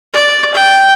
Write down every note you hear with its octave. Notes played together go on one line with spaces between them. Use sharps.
D5
G5